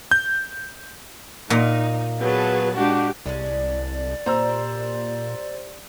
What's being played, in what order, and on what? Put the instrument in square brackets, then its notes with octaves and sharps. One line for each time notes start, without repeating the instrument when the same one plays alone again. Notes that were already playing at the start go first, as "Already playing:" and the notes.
[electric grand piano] G6
[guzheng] A#2 [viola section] D#4
[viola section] F#3 G#4 A5 [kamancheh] B3 B4
[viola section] G#3 G4 [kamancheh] D4 F#4
[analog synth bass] C2 [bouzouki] G#3 C#4 D4 [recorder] D5
[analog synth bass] A#2 [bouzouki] G3 [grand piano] C5 A#5 E6